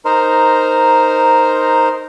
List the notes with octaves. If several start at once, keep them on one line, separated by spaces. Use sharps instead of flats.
D#4 A#4 C5